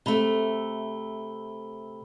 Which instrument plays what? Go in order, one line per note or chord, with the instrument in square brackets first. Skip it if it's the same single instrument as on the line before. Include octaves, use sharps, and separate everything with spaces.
[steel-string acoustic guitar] C3 A3 [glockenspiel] B5 G7